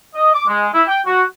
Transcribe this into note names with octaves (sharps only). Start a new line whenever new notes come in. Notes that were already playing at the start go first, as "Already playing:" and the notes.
D#5
D6
G#3
E4
G5
F#4